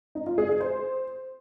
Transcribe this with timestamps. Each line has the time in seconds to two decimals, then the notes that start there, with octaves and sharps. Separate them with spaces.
0.15 D#4
0.27 F4
0.38 G#4
0.49 G#4
0.60 C5